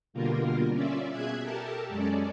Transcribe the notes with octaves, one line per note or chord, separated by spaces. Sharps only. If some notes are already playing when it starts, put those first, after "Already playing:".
B2 D3 G3 A#3 F4 A#4
C#4 F4 D5 E5
B2 G#4 E5 F#6 G#6
G4 A4 A#4 A5
F#2 G#3 C#4 A4 D5